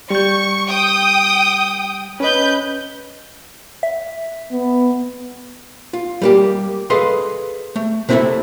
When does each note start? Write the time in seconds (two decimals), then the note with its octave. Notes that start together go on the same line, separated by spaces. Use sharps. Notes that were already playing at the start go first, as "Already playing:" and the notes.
0.10 G3 C#6 G6
0.68 G5 D#6
2.20 C#4 B4 D#5 G6
3.83 E5
4.52 B3
5.93 F4
6.22 G3 A#3 G4
6.90 G#4 A4 B4 D#5 F5 C6
7.76 A3
8.09 C3 C4 E4 G4 A4 E5